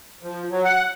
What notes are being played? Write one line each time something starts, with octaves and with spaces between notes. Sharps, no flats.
F3
F#3
F#5